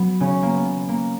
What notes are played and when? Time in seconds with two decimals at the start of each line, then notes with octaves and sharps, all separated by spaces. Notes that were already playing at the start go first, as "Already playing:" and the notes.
Already playing: F#3 B3
0.20 C#3 C#4
0.43 A#3
0.54 B3
0.88 A#3